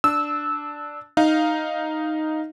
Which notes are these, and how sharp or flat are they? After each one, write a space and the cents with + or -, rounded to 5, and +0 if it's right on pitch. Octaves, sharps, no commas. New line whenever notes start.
D4 +0 E6 -15
D#4 +0 F5 +0